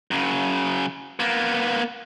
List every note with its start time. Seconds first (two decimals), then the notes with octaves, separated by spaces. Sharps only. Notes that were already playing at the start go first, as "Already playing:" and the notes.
0.11 F#2 C#3
1.20 A#3 B3